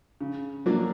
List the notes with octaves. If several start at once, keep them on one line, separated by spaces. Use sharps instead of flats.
C#3
F#3 A#3 D4